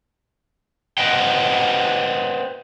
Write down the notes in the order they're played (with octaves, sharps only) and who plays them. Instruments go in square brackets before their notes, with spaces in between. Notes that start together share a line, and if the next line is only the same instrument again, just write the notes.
[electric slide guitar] B4 C5 D#5 F#5 G5